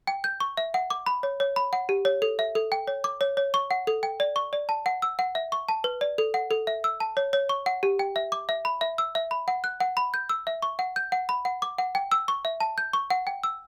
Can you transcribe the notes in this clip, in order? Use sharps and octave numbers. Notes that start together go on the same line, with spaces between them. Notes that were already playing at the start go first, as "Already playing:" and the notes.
G5
G6
C#6
E5
F#5
D6
B5
C#5
C#5
B5
F#5
G4
C#5
A4
E5
A4
G5
C#5
D6
C#5
C#5
C#6
F#5
A4
G5
D5
C#6
D5
A5
F#5
E6
F#5
E5
C#6
A5
B4
D5
A4
F#5
A4
E5
E6
A5
C#5
C#5
C#6
F#5
G4
G5
E5
D6
E5
B5
E5
E6
E5
B5
F#5
F#6
F#5
B5
G6
E6
E5
C#6
F#5
G6
F#5
B5
F#5
D6
F#5
G5
E6
C#6
E5
A5
G6
C#6
F#5
G5
E6